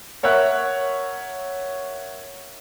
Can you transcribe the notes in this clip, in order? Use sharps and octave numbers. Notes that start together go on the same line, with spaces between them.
A#4 C#5 E5 F#5 F#6